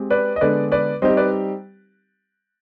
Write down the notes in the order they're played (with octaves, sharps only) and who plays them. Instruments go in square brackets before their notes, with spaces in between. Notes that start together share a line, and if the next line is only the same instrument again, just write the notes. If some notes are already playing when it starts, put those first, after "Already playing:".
Already playing: [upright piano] G#3 C4 G4
[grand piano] B4 D5
D#5
[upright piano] D3 G#3 B3 D4 [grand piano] B4 D5
[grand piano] B4 D5
[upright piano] G3 C4 D#4 G4 [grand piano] C5 D#5
[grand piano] B4 D5